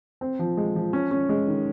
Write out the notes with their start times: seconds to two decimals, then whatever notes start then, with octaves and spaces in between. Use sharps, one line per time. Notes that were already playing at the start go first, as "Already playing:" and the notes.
0.21 C4
0.39 F3
0.57 G#3
0.76 F3
0.93 C#4
1.11 C#4
1.29 G#3
1.48 D#3